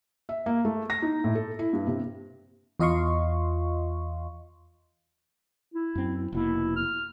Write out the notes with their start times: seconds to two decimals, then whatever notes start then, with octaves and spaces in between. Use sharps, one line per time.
0.29 E5
0.46 A#3
0.65 A3
0.90 A#6
1.02 D#4
1.24 A2
1.35 A4
1.59 E4
1.73 G2
1.87 C3
2.80 E2 F4 D#5 F5 C6 C#6
5.74 E4
5.95 F#2 C4
6.32 F1 B2 A#3 E4
6.76 F6